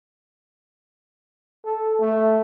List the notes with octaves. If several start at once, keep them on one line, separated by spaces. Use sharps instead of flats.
A4
A3